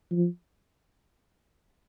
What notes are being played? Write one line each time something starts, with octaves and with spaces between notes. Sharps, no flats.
F3